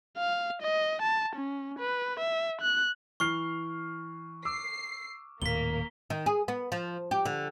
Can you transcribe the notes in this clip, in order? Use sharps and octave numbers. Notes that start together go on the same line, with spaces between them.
F5
D#5
A5
C#4
B4
E5
F#6
E3 C#6 F6 C7
D6 E6 C7
D#1 D#2 A2 A#3 B6 G7
D#3
G#4
B3
F3
G4
D3